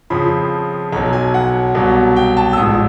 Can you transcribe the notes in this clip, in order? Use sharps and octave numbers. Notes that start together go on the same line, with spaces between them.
F2 C#3 F3 B5
B1 B2 F#3 A#5
G#5
F#5
C2 B2 F#3
G5
A5
E6
A1 G#2 F3 D#6